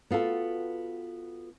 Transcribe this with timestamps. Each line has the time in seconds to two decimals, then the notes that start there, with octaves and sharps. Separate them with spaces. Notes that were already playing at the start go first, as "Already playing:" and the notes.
0.11 B3 F4 F#4 A4